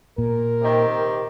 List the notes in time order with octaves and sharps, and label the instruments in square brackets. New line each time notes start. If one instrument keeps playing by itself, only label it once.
[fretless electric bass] A#2 [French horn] A#4
[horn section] C3 D#3 G4